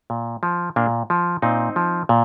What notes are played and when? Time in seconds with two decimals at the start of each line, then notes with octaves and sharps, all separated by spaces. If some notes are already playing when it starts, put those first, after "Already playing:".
0.10 A#2
0.43 F3
0.76 A#2 A#3 D4
1.10 F3
1.42 A#2 C4 D#4
1.76 F3
2.09 A#2